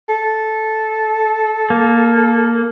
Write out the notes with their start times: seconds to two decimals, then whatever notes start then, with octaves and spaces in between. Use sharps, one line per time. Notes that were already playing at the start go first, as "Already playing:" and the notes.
0.09 A4
1.70 A#3